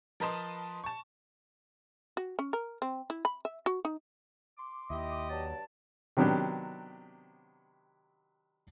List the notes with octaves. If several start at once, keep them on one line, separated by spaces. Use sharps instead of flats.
F3 A#4 B4 D#5 A5 C6
A5 C#6
F#4
C#4
A#4
C4
E4
B5
E5
F#4
D#4
C6 D6
D#2 E4 G4 D#5
G2 F#3 D5 A5
C3 D#3 F#3 B3 D4 G4